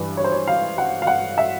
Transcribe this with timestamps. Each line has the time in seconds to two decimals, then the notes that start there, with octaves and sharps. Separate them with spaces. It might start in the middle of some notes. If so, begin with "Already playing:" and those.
Already playing: G2 E3 B4
0.17 C#5
0.24 C5
0.32 C#5
0.48 F5
0.78 F#5
1.02 F5
1.07 F#5
1.38 E5